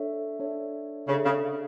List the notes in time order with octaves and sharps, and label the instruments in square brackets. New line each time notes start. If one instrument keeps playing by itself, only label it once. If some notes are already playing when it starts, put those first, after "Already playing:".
Already playing: [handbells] D4 A4 C#5 E5
D4 A4 C#5 E5
[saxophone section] C#3 [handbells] D4 A4 C#5 E5
[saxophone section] C#3